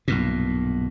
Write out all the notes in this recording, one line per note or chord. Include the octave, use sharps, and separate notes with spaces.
B1 G2 A#2